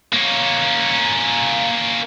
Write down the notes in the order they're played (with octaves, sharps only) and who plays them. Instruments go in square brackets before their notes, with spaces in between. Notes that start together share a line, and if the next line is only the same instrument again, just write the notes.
[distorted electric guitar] A#3 C#4